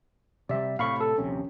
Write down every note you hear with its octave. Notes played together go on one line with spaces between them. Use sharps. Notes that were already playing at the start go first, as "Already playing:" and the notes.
C3 G3 D5 E5
A2 C3 A3 F5 B5 C#6
A4
D#1 A#1 C3 C#4